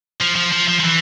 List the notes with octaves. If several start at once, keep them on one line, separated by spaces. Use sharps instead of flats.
F3
F3
F3
F3
F3
E3